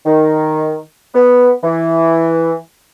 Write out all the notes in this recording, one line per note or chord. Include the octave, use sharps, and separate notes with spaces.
D#3
B3
E3